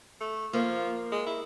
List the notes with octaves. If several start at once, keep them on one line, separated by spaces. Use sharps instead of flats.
A3
F3 A#3
G#3
E4